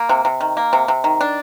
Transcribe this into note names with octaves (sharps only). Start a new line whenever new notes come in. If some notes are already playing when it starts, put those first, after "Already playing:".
Already playing: A#3
C3
C3
D#3
A#3
C3
C3
D#3
D4